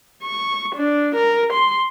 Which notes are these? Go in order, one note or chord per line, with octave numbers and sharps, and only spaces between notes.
C#6
D4
A#4
C6